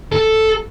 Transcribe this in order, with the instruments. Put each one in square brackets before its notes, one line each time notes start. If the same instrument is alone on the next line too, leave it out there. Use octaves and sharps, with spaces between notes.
[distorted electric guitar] A4